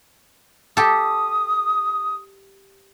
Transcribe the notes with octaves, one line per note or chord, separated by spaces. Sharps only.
G4 A4 D#6